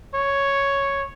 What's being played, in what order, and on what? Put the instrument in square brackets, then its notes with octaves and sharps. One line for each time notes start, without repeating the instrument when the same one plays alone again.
[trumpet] C#5